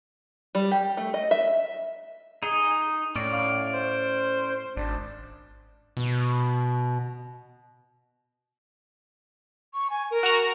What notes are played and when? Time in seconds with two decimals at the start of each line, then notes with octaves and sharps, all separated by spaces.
0.55 G3
0.71 G4
0.97 A3
1.14 D#5
1.31 E5
2.43 D#4 G#4 D#5
3.16 A2 C#4 D5
3.32 F5
3.73 C5
4.76 G#1 D4
5.97 B2
9.74 C#6
9.90 G#5
10.11 A#4
10.23 F#4 A#5